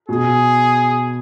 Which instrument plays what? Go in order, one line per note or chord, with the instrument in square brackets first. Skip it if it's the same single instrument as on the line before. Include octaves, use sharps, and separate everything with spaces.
[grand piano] B2 [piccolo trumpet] G#4